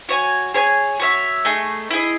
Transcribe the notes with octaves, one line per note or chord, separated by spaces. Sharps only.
F#4 C#5 G#5
G#4 C#5 G#5
F#4 C#5 E5
A3 D#4 G#4
E4 G#4 D#5